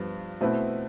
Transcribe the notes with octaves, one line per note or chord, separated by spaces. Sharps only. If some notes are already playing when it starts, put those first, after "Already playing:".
Already playing: G2 F3 B3
B2 A3 C4 E4 B4